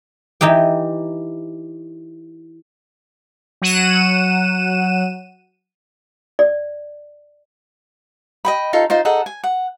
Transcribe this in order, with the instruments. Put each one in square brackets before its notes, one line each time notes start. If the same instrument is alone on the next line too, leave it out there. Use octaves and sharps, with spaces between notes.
[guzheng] E3 D#4 G4 G5
[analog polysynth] F#3 F#5 D#7 E7
[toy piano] D5
[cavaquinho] D#5 G5 B5
D#4 F4 A4
D#4 F4 C5
D#4 G#4 A4 F#5
G#5
F#5